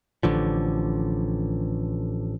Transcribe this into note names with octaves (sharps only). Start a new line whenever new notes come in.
A1 D3 F3